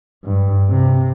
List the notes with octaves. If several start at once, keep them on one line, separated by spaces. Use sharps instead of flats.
G2
C3